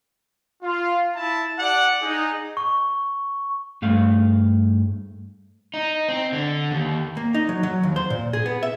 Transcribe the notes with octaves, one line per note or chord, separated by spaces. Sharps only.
F4
E4 A5
G4 D5 F#5
D#4 G#4
C#6
G2 A3 F5
D#4
C4
D3
D#2
A#3
D#4
F#3
F#3
D#2
C5
A#2
G#4
B3
E5